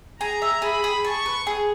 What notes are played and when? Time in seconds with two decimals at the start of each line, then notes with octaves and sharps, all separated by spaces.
0.20 G#4 A#5
0.42 E5
0.62 G#4 B5
0.84 G#4
1.05 A5 C#6
1.26 B4
1.47 G#4